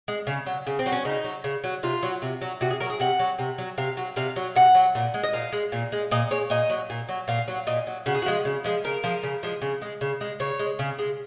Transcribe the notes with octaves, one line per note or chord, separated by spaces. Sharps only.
G#3
C#3
F#3
C#3
C4
F#3
C#4
C#3 D#4
F#3
C#3
F#3
C3 F4
F#3
C3
F#3
C3 F#4
G#4
F#3 A#4
G#4
C3 F#5
F#3
C3
F#3
C3 F5
F#3
C3 F5
F#3
C3 F#5
F#3
A#2
G#3
D#5
A#2 F5
G#3
A#2
G#3
A#2 D#5
G#3 C#5
A#2 D#5
F#3
A#2
F#3
A#2 F5
F#3
A#2 D#5
F#3
C#3 F#4
G#4
F#4
F3 G#3
C#3
F3 G#3
C#3 A#4
F3 G#3
C#3
F3 G#3
C#3
G#3
C#3
G#3
C#3 C#5
G#3
C#3
G#3